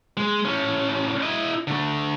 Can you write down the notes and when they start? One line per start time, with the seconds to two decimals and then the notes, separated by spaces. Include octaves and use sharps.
0.17 G#3
0.45 A2 C#4
1.23 E4 D#5
1.67 D3 A3